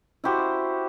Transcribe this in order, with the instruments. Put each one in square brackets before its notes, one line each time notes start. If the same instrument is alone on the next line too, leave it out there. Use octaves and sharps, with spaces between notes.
[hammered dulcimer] E4 F#4 G4 C5